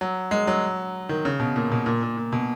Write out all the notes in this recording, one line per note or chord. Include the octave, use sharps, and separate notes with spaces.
F#3
G#3
F#3
D#3
C#3
B2
A#2
B2
A#2
A#2
A#2
B2